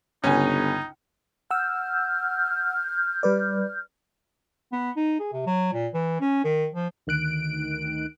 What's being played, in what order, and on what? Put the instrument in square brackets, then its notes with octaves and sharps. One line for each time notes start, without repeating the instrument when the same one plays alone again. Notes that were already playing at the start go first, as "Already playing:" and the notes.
[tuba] G1 [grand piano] C#2 G#5 [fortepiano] C#4 [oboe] D#4
[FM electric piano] F#5 E6 [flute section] F6 G6
[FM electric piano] G3 B4 D5
[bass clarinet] B3
D#4
G#4
C3
F#3
A#2
E3
C#4
D#3
F3
[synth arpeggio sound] D2 D#3 F#6 D7